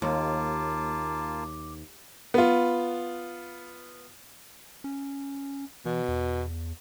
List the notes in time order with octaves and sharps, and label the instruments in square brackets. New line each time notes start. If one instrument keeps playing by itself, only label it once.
[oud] D#2 [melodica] A#3 F4 A5 [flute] D6
[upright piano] B3 F4
[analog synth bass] C#4
[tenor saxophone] B2 [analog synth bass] E3
[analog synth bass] E2